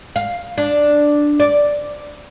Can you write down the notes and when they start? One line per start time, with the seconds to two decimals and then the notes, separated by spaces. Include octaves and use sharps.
0.16 F5
0.58 D4
1.40 D5